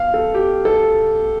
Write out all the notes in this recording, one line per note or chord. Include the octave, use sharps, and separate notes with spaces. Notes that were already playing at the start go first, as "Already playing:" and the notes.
Already playing: F5
A4
G4
A4